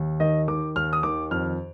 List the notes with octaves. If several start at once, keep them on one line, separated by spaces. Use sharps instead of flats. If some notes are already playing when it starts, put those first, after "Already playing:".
Already playing: D#2
D#3 D#5
D#3 D6
D#2 F6
D#6
D#3 D6
F2 F6